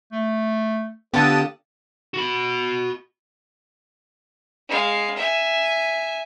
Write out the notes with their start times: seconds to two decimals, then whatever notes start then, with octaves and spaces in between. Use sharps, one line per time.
0.12 A3
1.14 D3 B3 F4 G4 A4 F#5 A5 D#6
2.14 F#4 B5
4.69 G#3 F5
5.16 E5 G#5